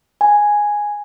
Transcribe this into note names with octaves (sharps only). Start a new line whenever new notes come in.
G#5